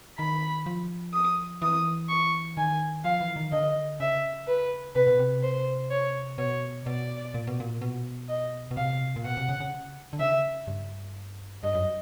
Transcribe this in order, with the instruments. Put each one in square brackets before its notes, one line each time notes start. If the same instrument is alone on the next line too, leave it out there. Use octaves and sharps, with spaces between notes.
[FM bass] D#3 [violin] B5
[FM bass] F3
[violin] D#6
[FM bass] E3 [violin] D#6
[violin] C#6
[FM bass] D#3 [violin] G#5
[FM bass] F3 [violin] F5
[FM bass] E3
D#3
[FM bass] D3 [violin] D#5
[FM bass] C#3 [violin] E5
[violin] B4
[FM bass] C3 [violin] B4
[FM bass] B2
C3
[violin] C5
C#5
[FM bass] B2 [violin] C#5
[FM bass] B2 [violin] D5
[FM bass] A#2
B2
A#2
B2
[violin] D#5
[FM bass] B2
[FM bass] C3 [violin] F5
[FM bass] A#2
[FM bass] B2 [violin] F#5
[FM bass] C3
C#3
C#3
D3
[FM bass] C#3 [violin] E5
[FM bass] G2
[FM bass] G2 [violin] D#5
[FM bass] F#2